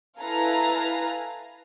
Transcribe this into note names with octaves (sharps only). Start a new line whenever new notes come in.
E4 A4 B4 F5 G#5 A#5